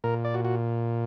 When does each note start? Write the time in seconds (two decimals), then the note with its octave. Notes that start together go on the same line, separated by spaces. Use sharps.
0.04 A#2 A#4
0.25 D5
0.34 F#4
0.45 F#4